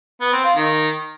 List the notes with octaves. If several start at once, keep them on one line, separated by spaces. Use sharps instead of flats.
B3
C4
F4
D#3